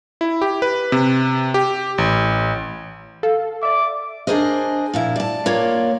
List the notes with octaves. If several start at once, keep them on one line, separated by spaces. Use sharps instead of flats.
E4
G4
B4
C3
G4
A1
A4 F5
D5 E5 D6
D4 G#4 A#4 C5 D#5
A#2 F3 E4
D5 A5
A#3 F4 C#5 D5